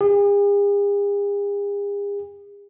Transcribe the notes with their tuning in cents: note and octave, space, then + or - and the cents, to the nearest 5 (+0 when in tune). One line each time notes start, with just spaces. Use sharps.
G#4 -45